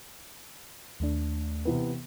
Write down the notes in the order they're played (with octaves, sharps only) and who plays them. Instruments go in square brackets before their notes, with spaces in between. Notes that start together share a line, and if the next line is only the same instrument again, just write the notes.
[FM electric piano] D#2 A3 D4
[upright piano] C3 E3 B3